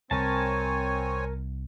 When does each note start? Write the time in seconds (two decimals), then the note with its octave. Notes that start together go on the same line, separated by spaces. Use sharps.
0.11 C2 C4 A#4 C#5 G#5 A5